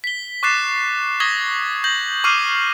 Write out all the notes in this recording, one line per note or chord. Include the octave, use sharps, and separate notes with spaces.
B6 G7
C#6 D6 F#6 A6 C7 E7
C#6 D#6 G#6 A#6 B6 G7
G6 A#6 F#7
C#6 D6 F6 C7 D#7